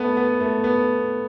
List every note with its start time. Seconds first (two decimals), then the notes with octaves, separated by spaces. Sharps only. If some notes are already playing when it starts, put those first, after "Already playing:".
Already playing: A3 B3
0.17 B3
0.40 A3
0.64 B3